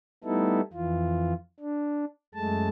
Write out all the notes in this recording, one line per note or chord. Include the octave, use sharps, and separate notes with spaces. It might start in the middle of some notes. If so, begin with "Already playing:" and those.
G3 A3 B3 D#4 E4 A4
F2 E3 F4
D4
F#2 G#3 A3 A5